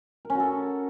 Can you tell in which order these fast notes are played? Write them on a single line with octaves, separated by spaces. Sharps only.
A#4 C#4 F#4 A4